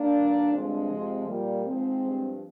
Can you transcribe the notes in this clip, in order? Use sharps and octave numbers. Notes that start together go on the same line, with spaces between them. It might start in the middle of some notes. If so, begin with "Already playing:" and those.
Already playing: A#3 D4
G2 D#3
G2 D3 F3 G#3 C4
F2 C3 F3
A#2 F3 G3 A#3
G#2 F3 G#3 C4
G2 F3